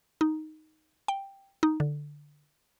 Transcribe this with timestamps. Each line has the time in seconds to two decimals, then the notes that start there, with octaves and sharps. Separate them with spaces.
0.21 D#4
1.08 G5
1.63 D#4
1.80 D3